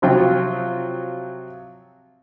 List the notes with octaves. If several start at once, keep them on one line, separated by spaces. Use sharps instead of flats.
C3 F3 F#3 C4 F4 G5